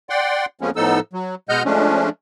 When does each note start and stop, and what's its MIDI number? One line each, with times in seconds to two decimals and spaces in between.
0.10 0.46 74
0.10 0.46 78
0.10 0.46 79
0.10 0.46 84
0.61 0.70 41
0.61 0.70 53
0.61 0.70 56
0.61 0.70 58
0.61 0.70 59
0.61 0.70 61
0.76 1.00 45
0.76 1.00 53
0.76 1.00 59
0.76 1.00 63
0.76 1.00 69
0.76 1.00 88
1.13 1.35 54
1.49 1.63 47
1.49 1.63 56
1.49 1.63 75
1.49 1.63 78
1.49 1.63 89
1.49 1.63 91
1.65 2.09 53
1.65 2.09 56
1.65 2.09 57
1.65 2.09 61
1.65 2.09 62